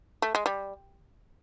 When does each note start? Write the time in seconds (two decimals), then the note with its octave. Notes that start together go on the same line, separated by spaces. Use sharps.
0.22 A3
0.35 G#3
0.46 G3